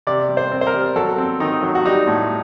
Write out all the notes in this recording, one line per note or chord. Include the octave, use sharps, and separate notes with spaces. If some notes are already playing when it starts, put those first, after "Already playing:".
C3 D5
G3
C5
C4
C5
A#4
G3
F#3 A4
C4
D#3 D#4
F#3
F#4
G3 D#4
A2